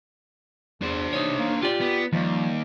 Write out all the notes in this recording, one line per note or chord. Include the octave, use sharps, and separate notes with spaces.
E2 D4 C5
C3 D#4 C#5
A#3
F4 G4 D5
B3
D#2 F3 G3